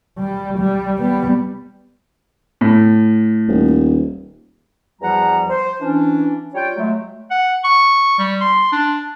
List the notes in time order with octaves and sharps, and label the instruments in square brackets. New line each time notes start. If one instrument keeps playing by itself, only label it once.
[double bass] G3
G3
G3 B3
[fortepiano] A2
[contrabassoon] D#1
[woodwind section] E2 F3 G3 F#4 F#5 A#5
C5
E3 C#4 D4
G3 F4 C#5 G5
F#3 G#3 A3
[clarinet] F#5
C#6
G3
C6
D4